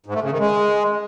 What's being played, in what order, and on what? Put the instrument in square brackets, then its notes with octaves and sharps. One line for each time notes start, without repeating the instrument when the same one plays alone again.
[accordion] G#2
A3
C#3
D#3
G#3